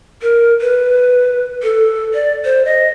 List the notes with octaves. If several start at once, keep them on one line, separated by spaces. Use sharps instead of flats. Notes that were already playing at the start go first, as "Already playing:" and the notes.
A#4
B4
A4
D5
C5
D#5